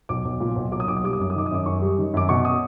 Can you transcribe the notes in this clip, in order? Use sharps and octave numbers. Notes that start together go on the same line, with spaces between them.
B1 D6
B1
A#2
B1
F#3 D6
D#6
B1 D6
D#6
G3 D6
D#6
F#2 D6
D#6
D#3 D6
D#6
F#2 D6
F#2 C#6
G3
D#3
F#2 D6
B2 C#6
D#6